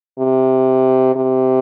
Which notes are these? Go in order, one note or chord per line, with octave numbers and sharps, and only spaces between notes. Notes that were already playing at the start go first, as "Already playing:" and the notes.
C3
C3